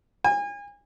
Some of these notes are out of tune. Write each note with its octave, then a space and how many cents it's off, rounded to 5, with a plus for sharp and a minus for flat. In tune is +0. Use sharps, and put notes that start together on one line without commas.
G#5 -35